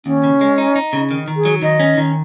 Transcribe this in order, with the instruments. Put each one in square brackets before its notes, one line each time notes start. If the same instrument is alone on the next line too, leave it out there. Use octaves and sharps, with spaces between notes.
[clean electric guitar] D#2 [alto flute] C#4
[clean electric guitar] C#3
G#3
D#4
D#4
C#3
D#3
D#3
[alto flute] G#4
[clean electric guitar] F#3
[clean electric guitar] D#3 [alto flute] D#5
[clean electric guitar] C#4
D#3